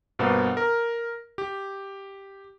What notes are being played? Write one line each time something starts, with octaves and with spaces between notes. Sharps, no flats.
G2 B2 A#3 B3 C5
A#4
G4